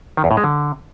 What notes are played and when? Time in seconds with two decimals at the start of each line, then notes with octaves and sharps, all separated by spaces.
0.17 D#3
0.24 E2
0.31 A2
0.37 G#3
0.44 D3